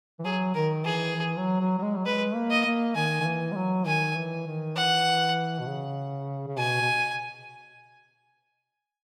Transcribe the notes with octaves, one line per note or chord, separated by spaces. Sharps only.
E3
F#3 G#4
D#3 A#4
E3 G#4
E3
F#3
F#3
F#3
G#3
F#3
G#3 B4
A#3
D#5
A#3
D#3 G#5
D#3
E3
G#3
F#3
D#3 G#5
E3
D#3
E3 F#5
B2
C#3
C#3
B2 G#5
B2